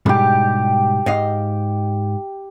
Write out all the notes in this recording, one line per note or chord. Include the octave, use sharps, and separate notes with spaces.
G#2 B2 G3 G4 D6
G#2 D#5 F5